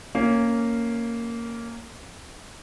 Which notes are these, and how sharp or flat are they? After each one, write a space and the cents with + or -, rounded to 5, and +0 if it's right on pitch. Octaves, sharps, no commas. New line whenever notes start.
A#3 -10 C#4 +0